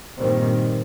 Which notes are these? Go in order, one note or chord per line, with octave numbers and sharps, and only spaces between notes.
G2 A#2 D#3 G3 C4